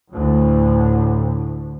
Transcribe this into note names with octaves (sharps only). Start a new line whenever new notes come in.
D2 A2